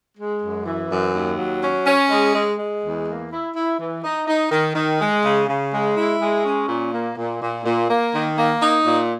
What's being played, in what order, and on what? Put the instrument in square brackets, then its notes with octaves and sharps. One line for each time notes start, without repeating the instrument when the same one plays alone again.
[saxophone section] G#3
F#2
E3
F#2
D#2
F#3
C#4
C#4
G#3
G#3
G#3
E2
A#3
E4
E4
E3
D#4
D#4
D#3
D#3
G#3
C#3
C#3
G#3
E4
G#3
C#4
A#2
A#3
A#2
A#2
A#2
A#3
D#3
A#3
D#4
A#2